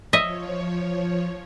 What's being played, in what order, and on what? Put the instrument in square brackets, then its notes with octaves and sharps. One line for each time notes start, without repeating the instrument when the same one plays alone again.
[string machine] F3 C#5 [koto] D#5 E5